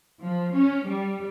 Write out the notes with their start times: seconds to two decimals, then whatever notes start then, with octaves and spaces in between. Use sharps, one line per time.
0.21 F3
0.54 C#4
0.87 G3